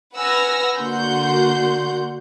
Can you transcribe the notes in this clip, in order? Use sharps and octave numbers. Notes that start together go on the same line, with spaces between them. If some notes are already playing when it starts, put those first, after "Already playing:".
B4 F#5 G#5 E6 F6 A#6
D3 A#3 F#4 F#5 C6 G6